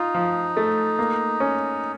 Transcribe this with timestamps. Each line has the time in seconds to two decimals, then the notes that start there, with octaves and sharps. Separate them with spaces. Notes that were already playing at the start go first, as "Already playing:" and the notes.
Already playing: D#4 F4
0.15 F3
0.57 A3
0.99 A#3
1.40 C#4